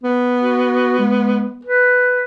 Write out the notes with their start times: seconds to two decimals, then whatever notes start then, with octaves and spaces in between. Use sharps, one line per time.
0.04 B3
0.39 F#4
0.99 G#3
1.65 B4